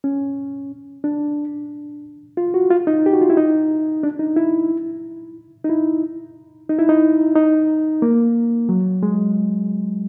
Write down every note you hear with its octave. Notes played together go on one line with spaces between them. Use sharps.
C#4
D4
F4
F#4
F4
D#4
G4
F#4
F4
E4
D#4
D4
D#4
E4
D#4
E4
D#4
E4
D#4
D#4
A#3
F#3
G#3